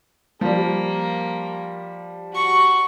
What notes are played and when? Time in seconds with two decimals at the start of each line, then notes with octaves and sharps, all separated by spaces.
0.41 F3 G3 A#3
2.34 F#4 C#6